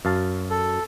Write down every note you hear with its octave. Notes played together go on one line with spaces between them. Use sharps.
F#2 F5 A5
A4